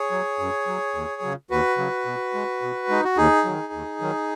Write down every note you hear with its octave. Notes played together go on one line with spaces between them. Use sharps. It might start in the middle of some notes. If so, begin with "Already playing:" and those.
Already playing: G#4 C#5
F#3
F#2
F#3
D#2
C#3 F#3
D#2 F#4 B4
C#3 F#3
B2
G#3
B2
G#3 D#4
F#4
D#2 D#4 G#4
D#3 F#3
D#2
D#3 F#3